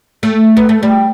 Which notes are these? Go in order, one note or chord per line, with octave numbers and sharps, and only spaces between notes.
A3
B3
A3
G3